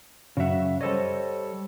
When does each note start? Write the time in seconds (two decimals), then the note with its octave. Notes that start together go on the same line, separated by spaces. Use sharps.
0.37 F#2 C#3 F#3 E5 F#5
0.81 G3 A4 C5 C#5 D#5